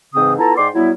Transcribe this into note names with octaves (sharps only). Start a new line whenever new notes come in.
G#2 C#3 E3 C4 D#6
B3 E4 F4 A4 A5 A#5
G#2 D5 G5 C6 D6
F#3 G3 B3 E4